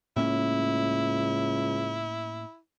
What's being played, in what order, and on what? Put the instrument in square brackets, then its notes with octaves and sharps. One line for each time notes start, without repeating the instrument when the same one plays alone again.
[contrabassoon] C#2 [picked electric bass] A2 A#3 C#4 [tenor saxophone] E4